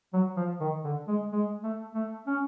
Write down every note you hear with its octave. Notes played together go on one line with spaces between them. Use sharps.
F#3
F3
D#3
D3
G#3
G#3
A3
A3
C#4